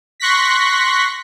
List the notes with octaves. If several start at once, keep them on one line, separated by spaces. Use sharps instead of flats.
C6 C#6 F#6 A#6 B6